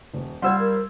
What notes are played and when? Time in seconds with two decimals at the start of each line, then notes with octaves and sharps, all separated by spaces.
0.14 D#1
0.42 G3 F4 C5 F#5 C6 E6 G#6
0.58 A#4